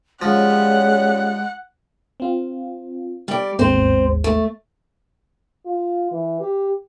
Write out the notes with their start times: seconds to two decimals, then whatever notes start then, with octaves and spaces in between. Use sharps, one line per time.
0.22 F3 G3 G#3 C#4 F#5
2.20 C4 F4
3.28 G3 D5
3.59 G#1 D#2 G#3 C4 C5
4.24 A3
5.66 F4
6.11 E3
6.41 G4